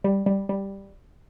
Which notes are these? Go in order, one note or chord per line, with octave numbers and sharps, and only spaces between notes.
G3
G3
G3